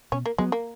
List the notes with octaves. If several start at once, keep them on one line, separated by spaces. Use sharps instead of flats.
B2 C#4
A#3
F#3 G#3 B3
A#3